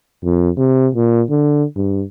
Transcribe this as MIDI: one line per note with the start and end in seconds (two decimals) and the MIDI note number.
0.24 0.50 41
0.58 0.88 48
0.95 1.23 46
1.30 1.64 50
1.77 2.04 43